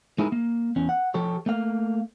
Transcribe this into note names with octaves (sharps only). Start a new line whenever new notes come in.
G#3 D#4 E4 G#4 A#4
A#3
E2 C#4
F#5
F3 G4 A4 C#5
A3 A#3 F5